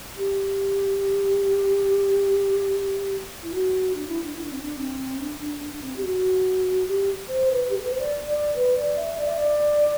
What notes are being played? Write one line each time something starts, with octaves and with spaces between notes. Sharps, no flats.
G4
E4
F#4
D4
E4
D4
E4
D4
C4
D4
C4
D4
D4
D4
D4
C4
G4
F#4
G4
C5
B4
G4
A4
B4
C5
D5
D5
B4
D5
E5
D5
E5
D5